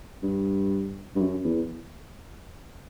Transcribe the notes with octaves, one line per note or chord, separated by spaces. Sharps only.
G2
G2
F#2
E2